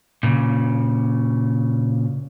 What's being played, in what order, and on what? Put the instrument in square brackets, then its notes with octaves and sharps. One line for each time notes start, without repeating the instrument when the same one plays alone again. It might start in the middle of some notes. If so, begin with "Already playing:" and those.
[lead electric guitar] A#2 C#3